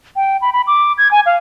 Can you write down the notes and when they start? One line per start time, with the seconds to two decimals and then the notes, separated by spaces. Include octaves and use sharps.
0.16 G5
0.42 B5
0.53 B5
0.67 D6
0.98 G#6
1.11 G#5
1.26 F5